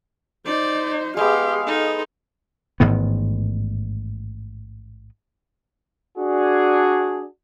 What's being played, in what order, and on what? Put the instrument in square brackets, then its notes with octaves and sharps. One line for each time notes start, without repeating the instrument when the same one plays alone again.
[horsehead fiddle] D#4 C5 [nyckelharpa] D5
[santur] G#3 B3 [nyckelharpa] G4 [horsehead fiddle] G#4 F5
[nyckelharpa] D#4 A4
[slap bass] A1 G#2 D#3 B3
[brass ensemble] D4 F#4 G#4